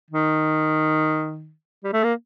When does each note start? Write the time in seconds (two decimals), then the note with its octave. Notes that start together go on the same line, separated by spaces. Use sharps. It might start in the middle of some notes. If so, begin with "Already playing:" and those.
0.10 D#3
1.84 G3
1.93 A3
2.04 A#3